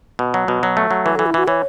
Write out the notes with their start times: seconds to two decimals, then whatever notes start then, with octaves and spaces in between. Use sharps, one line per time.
0.19 B2
0.34 F#3
0.48 B2
0.63 F#3
0.77 A3
0.91 F#3
1.05 E3 B4
1.15 E3 A4
1.26 E4
1.34 E3 F#4
1.48 E3 C#5